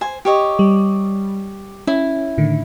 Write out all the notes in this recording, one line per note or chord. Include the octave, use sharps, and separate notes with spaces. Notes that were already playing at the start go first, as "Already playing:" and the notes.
C5 G#5
G4 C#5 D#5
G3
C#4 E4
A2 D3 D#3